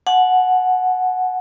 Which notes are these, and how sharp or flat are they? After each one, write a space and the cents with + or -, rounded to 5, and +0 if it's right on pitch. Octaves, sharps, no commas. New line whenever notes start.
F#5 -10 A5 -40